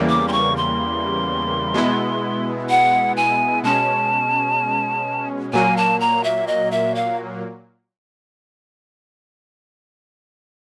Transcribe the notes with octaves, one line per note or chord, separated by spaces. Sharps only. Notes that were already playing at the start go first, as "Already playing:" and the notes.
Already playing: E2 C#3 E3 G3 A#3
D6
C6
C#6
C6
B2 G#3 B3 E4
F#5
G#5
B2 G#3 C#4 A5
A#2 F#3 A#3 G#5
A5
A#5
E5
D#5
E5
F5